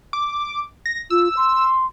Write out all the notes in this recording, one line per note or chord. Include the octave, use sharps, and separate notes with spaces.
D6
A#6
F4 E6
C6